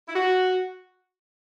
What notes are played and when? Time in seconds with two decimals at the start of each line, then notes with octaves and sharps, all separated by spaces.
0.09 E4
0.15 F#4